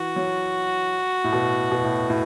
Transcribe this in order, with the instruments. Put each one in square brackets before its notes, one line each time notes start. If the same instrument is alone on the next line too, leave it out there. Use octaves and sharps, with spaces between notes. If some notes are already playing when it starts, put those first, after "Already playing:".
Already playing: [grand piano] E3 [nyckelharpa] F#4
[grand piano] F#3
A2
B2
B2
A2
A2